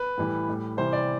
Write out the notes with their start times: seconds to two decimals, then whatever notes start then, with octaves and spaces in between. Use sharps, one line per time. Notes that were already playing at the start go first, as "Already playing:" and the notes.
Already playing: B4
0.18 A2 E3 G3
0.49 A2 G3
0.77 C3 E3 G3 C5
0.93 D5